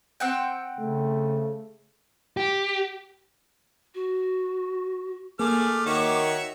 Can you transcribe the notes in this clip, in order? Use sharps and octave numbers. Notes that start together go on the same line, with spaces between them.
C4 F#5 G5
C#3 A3
G4
F#4
A3 A#3 G#4 D6 F6
D#3 F#4 C#5 E5